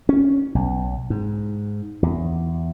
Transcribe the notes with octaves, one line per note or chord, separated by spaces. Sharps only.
C#4
B1
G#2
E2